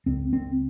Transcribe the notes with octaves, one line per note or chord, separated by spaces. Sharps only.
C#2 C#3 C4
C4